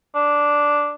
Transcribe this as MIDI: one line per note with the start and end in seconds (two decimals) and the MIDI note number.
0.15 0.94 62